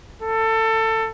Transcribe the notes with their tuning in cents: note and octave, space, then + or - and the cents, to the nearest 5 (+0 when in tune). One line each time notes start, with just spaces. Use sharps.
A4 +20